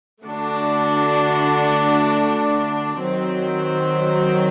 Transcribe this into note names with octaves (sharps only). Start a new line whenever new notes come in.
D3 A3 D4 F#4
D#3 F#3 C4